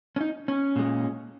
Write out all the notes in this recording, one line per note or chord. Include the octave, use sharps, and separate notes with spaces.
C#4
D#4
C#4
A#2 G#3